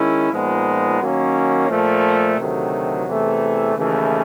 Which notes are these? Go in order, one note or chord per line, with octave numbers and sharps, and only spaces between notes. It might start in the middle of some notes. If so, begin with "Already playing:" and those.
Already playing: D#3 G#3 C#4 E4
A#2 F3 G#3 B3 D#4
D#3 F#3 A#3 C#4
A#2 F3 A3
D2 C3 D#3 F#3 A3
E2 C3 E3 A3
D#2 C#3 E3 A3